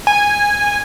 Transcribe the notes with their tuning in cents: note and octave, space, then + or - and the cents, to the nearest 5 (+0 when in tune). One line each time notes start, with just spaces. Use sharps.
G#5 -10